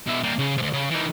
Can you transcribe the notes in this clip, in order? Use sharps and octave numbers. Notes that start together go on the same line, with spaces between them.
B2 E5
G3 A#3
C#3
D2 C3
C#3
E3 D#4